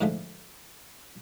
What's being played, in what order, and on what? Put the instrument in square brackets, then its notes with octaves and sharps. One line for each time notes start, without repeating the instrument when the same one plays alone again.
[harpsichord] G#2 D3 F3 G#3 A3